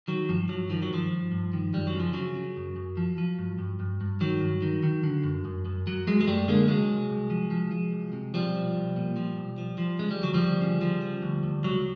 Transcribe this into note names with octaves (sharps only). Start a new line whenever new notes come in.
D#3 F#3
G2 F3
G2 F#3
D#3 F3
F#3
G2 F3
G2
G2
D#3
F#2 G3
F#3
C#3
F3
C#3 F#3
C#3
F#2
F#2
F3
F3
G2
G2
G2
G2
D#3 F#3
G2
D#3
D#3
D3
F#2
F#2
F#2
F#2 F#3
F#2 F#3 G#3
G#3
F#2 G3 A3
D3 G#3 A#3
C2 F#3 G#3
C2
C2
F3
F3
F3
C2
C3
B1 F3 G3
B1
B1
A#2
F3
B1
F3
F3
C#3 G#3
G3
D2 F#3
F3 G3
D2
C#3
F3
F3
D2
D2
C#2 F#3